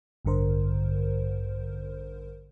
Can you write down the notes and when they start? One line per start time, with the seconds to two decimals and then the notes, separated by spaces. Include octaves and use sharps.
0.25 A1 G2 D3 A#4 C5